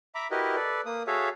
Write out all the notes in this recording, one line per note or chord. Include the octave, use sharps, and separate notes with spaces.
E5 A#5 B5 D6
E4 F#4 G4 A#4 B4 D#5
A4 B4 D5
A#3 D#6
F#4 G#4 A4 C#5 E5 F5